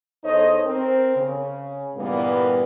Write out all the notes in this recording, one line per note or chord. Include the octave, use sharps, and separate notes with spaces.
E2 D#4 A4 C5 C#5 D#5
C4 A#4
C#3
G2 A#2 E3 G3 A#3 B3